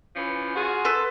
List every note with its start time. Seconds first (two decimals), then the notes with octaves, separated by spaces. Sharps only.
0.15 E3 F3 C#4
0.56 F4 F#4 G#4
0.85 A4 B4 C5